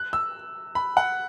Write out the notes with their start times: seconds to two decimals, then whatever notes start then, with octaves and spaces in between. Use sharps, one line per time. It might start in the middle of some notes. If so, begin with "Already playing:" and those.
Already playing: F#6
0.13 E6
0.75 B5
0.97 F#5